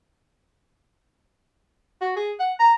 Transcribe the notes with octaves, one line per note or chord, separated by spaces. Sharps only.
F#4
G#4
F#5
A#5